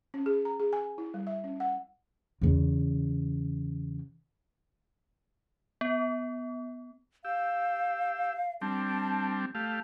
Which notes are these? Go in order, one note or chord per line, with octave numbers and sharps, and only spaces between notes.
C#4
G#4
A#5
G#4
G#5
E4
G3
E5
C#4
F#5
E2 C#3
B3
G4 F5 E6
G3 C4 D4 A5
A3 G4 F5 A5